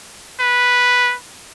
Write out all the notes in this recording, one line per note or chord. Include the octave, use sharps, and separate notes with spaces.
B4